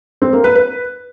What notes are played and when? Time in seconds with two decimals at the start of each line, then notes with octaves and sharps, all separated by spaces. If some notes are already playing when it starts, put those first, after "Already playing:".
0.22 C4
0.33 A#3
0.44 B4
0.55 B4